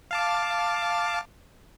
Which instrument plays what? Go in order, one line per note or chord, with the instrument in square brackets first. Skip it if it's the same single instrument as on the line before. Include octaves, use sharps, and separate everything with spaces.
[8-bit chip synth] F5 A5 D6